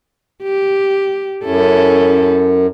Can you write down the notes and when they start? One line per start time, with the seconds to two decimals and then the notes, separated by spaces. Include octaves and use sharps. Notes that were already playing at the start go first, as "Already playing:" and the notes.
0.43 G4
1.45 F#2 C#4 E4 A4